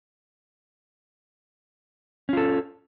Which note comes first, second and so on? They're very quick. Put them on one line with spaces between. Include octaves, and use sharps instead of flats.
C#4 F4 A4